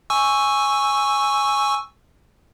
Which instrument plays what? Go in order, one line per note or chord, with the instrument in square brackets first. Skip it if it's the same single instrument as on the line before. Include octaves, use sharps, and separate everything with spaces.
[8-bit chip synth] G#5 C#6 E6